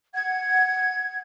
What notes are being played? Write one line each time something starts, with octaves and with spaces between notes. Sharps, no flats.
F#5 G#6